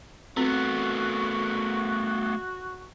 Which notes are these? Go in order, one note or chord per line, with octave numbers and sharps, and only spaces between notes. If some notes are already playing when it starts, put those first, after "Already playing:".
A3 B3 C4 F#4